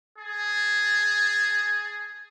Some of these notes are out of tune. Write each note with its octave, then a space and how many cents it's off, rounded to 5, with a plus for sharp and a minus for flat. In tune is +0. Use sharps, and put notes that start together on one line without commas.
G#4 +0 A5 +0